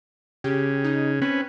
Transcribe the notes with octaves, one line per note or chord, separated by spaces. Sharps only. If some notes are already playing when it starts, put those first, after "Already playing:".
C#3 G4
D#4
C4 C#4 B4